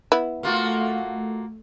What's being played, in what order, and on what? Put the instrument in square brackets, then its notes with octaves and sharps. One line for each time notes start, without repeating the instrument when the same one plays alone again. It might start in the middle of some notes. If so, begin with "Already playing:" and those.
[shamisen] B3 E4
[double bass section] A3 [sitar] A#3 F4 F#4